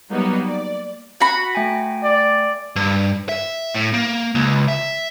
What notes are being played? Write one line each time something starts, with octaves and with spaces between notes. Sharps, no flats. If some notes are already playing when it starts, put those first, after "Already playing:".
F#3 G3 A#3 B3 D#4 F#4
D5
F#4 B5
A3 G5 G#5
D5
G2
E5
A2
A#3
C#2
E5